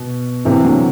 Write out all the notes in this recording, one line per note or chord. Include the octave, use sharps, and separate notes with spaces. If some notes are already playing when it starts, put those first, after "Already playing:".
Already playing: B2
C3 E3
D3 F#3